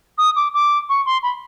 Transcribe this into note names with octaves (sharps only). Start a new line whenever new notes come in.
D#6
D6
D6
C#6
C6
B5